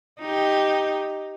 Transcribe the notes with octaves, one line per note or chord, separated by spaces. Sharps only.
D#4 G4